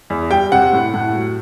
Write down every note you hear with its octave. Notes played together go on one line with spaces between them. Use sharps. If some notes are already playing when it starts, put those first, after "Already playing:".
E2
G3 G5
C3 F#5
A2
A2
F#3